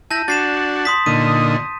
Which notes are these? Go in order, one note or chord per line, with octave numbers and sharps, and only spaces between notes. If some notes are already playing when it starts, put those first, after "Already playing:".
E4 A5 G6 A#6
D4 F#4 A6 C7 E7
C6 D#6 B6
A#2 D3 D#4 D#7